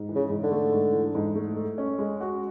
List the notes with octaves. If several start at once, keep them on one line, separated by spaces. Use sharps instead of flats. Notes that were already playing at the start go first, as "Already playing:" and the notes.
Already playing: G#2
E3
C#3
G#2
D3
A3
G#2
E3
G#2
A3
A4
C#4
G#3
F#4